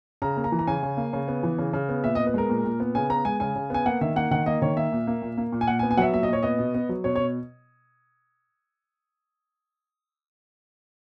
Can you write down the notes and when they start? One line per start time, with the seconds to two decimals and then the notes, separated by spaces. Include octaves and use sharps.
0.22 C#3 A#5
0.37 A#3
0.44 A#5
0.52 E3
0.59 A#5
0.67 C#3 G#5
0.83 C#3
0.97 A#3
1.13 C#3
1.28 B3
1.43 E3
1.58 C#3
1.73 C#3
1.89 B3
2.04 A#2 E5
2.15 D#5
2.19 B3
2.27 B4
2.34 G#3 A#4
2.49 A#2
2.65 A#2
2.80 B3
2.95 C#3 G#5
3.10 B3 A#5
3.25 G#3 G#5
3.40 C#3 G#5
3.56 C#3
3.70 B3 G#5
3.86 A#3 F#5
4.01 D#3 E5
4.16 A#3 F#5
4.31 D#3 F#5
4.46 A#3 D#5
4.62 D#3 C#5
4.77 A#3 E5
4.92 A#2
5.07 A#3
5.22 A#2
5.37 A#3
5.52 A#2
5.61 G#5
5.67 A#2 F#5
5.79 G#5
5.83 B3
5.91 G#5
5.98 F#3 E5 F#5
6.13 A#2 E5
6.23 D#5
6.29 A#2 C#5
6.43 B3 D#5
6.59 B2
6.74 B3
6.89 F#3
7.04 B2 C#5
7.15 C#5
7.20 B2